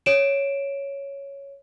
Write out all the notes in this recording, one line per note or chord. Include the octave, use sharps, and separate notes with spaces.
C#5 D7 E7